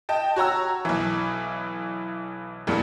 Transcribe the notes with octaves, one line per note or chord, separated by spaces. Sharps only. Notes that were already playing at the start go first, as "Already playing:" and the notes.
D#5 G5 A5
F#4 C#5 A#5 E6
B1 E3
E2 G2 A#2 G3